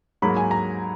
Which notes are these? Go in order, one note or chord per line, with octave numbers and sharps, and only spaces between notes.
G#2 F#3 A#3 B5
G#5
A#5